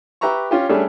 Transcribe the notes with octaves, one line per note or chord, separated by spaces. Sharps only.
G4 B4 E5 A#5 C#6
C#4 F4 G4
G3 A3 C#4 D4 G#4